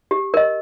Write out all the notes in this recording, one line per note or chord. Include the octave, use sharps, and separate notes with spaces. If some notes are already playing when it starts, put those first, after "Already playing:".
G4
A#4 D#5